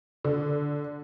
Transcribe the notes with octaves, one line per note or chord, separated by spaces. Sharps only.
D3